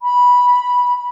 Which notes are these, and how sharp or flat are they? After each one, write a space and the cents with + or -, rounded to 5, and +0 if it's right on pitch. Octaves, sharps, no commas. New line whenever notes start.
B5 -10